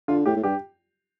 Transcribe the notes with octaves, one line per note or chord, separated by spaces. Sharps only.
D3 F4
A2 G4
A2
G2 G4